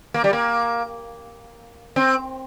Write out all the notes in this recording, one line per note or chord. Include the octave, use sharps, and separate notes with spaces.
A#3
G3
A#3
C4